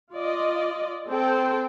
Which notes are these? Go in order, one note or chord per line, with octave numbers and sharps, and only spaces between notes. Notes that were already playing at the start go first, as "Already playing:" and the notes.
F4 D5 D#5
C4 A4 C5 G5